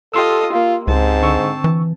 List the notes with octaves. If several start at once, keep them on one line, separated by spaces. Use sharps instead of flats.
F4 G4 A4 D#5 C6 E6
A#3 F4
C#2 G#2 C4 A5
D3 C#6 E6
E3